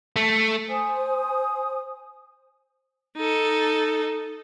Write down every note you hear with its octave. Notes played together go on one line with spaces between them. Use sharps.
A3
C5 G#5 D#6
D#4 A4